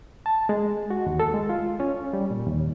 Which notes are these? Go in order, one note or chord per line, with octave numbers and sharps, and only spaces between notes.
A5
G#3
F#4
D#2
A4
G#3
F4
C#4
G3
A#2
D#2